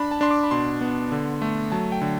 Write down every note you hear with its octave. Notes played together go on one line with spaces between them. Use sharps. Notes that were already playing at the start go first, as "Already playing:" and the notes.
Already playing: D4 B5
A5
D4 C6
D6
B5
B2 C6
B3
D3
A3
F#3 A5
G5
D3